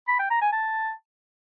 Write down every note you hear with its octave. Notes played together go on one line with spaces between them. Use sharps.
B5
G5
A#5
G#5
A5